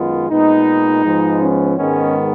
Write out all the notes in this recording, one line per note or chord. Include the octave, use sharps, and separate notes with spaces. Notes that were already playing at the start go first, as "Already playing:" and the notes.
Already playing: F#2 D#3 G#3 B3 F4
A#2 G#3 B3 D#4
G#2 F3 G#3 B3
C#4
G#2 D#3 G#3 B3 C#4